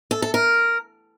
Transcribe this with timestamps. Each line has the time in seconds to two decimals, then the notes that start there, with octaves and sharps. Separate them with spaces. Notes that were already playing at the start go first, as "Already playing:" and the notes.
0.11 A4
0.22 A4
0.34 A#4